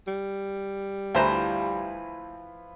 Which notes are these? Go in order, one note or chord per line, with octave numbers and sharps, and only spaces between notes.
G3
D2 F3 E4 B4 C5 A#5